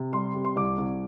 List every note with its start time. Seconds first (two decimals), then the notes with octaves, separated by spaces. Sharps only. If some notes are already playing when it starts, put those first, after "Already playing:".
Already playing: C3
0.13 G3 C6
0.34 C3
0.45 C6
0.56 C2 D6
0.78 C2